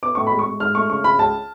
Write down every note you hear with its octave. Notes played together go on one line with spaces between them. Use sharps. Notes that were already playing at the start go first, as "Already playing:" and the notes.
B3 D6
A2 C#6
B5
G#3
C#6
G#3
G#2 F6
A3 C#6
C#3 C#6
C#3 B5
C#2 A5